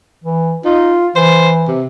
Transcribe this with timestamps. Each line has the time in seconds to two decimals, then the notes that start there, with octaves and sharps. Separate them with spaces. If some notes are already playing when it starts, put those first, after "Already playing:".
0.24 E3
0.65 D#4 F4
1.16 E3 C5
1.68 C3